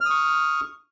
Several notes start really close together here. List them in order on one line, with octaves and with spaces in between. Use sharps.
F6 D#6 C#6